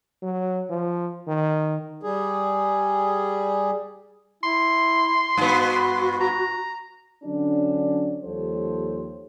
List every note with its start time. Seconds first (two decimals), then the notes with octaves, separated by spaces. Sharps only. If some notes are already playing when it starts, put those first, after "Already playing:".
0.23 F#3
0.70 F3
1.28 D#3
2.03 G3 G#4
4.43 E4 C6
5.37 G2 B3 F#4
6.21 A#5
7.23 D3 F#3 C#4 D4
8.24 D#2 F3 G3 A4 C5 C#5